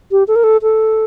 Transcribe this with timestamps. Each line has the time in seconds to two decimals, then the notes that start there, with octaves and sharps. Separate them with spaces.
0.11 G4
0.28 A4
0.35 A#4
0.43 A4
0.62 A4